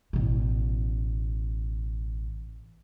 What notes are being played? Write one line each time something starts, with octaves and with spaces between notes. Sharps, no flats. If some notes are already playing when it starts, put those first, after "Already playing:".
A1 B2